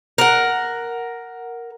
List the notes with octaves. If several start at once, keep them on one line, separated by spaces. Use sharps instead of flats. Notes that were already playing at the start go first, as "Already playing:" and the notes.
A#4 F#5